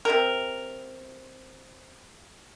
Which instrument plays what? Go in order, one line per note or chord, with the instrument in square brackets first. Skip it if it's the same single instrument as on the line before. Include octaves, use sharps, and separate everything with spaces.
[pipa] C3 A#4